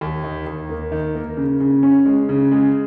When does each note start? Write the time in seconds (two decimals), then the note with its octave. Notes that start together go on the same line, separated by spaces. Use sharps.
0.01 D#2
0.24 D#3
0.47 D#2
0.69 A#3
0.92 D#3
1.15 A#3
1.37 C#3
1.60 C#3
1.83 C#4
2.06 G#3
2.29 C#3
2.51 G#3